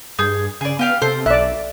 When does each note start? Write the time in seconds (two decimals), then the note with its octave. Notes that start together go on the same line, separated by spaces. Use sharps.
0.19 G2 G#4 G6
0.61 C#3 G#4 D5
0.79 B3 F4 G4 F5
1.02 C3 A4 C5
1.26 B1 D5 E5 F#6